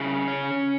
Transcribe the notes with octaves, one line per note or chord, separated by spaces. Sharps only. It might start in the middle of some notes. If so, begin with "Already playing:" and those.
Already playing: C#3 E4
C#4